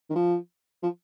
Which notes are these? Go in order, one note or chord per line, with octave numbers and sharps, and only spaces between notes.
D#3
F3
F3